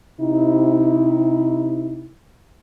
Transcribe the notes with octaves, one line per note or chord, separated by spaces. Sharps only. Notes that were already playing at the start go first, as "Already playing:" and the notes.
C3 D#4 E4